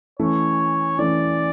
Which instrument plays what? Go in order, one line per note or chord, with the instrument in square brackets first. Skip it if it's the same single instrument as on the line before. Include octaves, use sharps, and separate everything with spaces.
[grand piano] E3 A3 C#4 [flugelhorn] C#5
[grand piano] E3 A3 C#4 [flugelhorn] D5